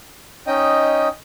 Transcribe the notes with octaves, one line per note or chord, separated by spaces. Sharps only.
C#4 D#4 D#5 G5